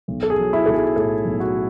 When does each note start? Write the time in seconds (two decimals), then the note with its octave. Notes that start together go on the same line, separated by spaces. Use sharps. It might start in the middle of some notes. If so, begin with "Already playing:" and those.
0.08 B1
0.23 A4
0.30 G#4
0.38 F#3
0.53 E4
0.66 B1 A4
0.74 G#4
0.96 A2 A4
1.25 B1
1.40 F#4